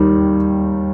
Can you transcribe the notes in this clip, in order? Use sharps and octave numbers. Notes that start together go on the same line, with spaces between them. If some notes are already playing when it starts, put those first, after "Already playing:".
Already playing: D#2 D#3 G3